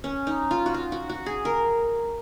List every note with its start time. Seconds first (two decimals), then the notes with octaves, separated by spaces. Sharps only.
0.04 C#4
0.27 D#4
0.51 F4
0.66 F#4
0.74 F4
0.92 F#4
1.09 F#4
1.26 G#4
1.45 A#4